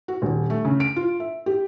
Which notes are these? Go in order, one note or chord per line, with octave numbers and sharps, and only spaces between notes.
F#4
D#1
A3
C#3
D7
F4
E5
G4